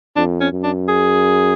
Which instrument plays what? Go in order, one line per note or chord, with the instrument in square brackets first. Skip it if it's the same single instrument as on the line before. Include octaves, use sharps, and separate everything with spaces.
[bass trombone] F2 [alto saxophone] D4
[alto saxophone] C#4
[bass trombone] F#2
[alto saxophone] D4
G#4